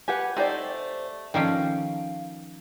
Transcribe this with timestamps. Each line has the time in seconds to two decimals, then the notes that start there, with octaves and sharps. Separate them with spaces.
0.08 G4 B4 F#5 G#5
0.36 A3 C4 D#4 G4 C5 D5
1.34 D#3 F3 C#4 A4 D5 F5 G5